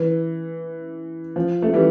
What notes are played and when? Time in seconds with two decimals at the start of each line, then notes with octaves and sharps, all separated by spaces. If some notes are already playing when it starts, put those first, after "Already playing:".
Already playing: E3
1.36 F3
1.62 A3
1.73 E3 G3